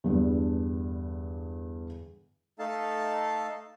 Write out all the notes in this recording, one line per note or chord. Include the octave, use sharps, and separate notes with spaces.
E2 G2 D3
A3 D#4 A4 F5 A5